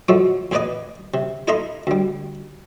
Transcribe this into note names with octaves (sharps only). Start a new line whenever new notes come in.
F3 F#3 G#3 A3 A4
E2 G#4 B4 D5 D#5 D#6
C3
E4 A4 D#5 E5 A#5 C6
D2 G3